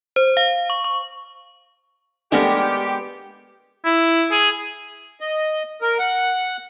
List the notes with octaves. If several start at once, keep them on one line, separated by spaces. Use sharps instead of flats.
C5
F5
C#6
C#6
G#3 A3 B3 D4 G4 A#4
E4
G#4
D#5
A#4
F#5